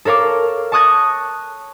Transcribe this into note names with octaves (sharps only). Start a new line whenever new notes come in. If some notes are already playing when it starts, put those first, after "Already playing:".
A4 A#4 C#5 F5 D6
A5 C#6 D#6 F#6 G#6 A#6